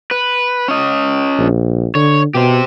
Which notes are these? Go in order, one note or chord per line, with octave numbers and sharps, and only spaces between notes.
B4
C#4 D#5
A#1
D3 C#5
B2 G4 C5